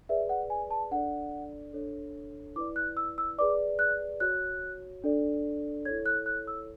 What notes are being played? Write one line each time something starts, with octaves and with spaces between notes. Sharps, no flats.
G#4 B4 D5 E5
F#5
G#5
A5
D4 A4 D5 F#5
D4 A4 C#5
E4 B4 D5 D6
F#6
E6
E6
G#4 B4 D5 D6
F#6
F#4 C#5 F#6
D4 A4 D5
E4 A4 C#5 G#6
F#6
F#6
E6